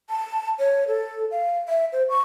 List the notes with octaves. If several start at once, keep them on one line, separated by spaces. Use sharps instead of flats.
A5
C#5
A4
F5
E5
C5
C#6